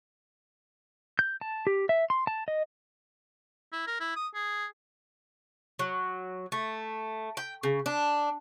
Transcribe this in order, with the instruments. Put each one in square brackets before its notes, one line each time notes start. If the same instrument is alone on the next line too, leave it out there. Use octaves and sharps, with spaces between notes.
[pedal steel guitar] G6
A5
G4
E5
C6
A5
D#5
[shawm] E4
A#4
E4
D#6
G#4
[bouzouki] F#3
A3
G5
C#3
D4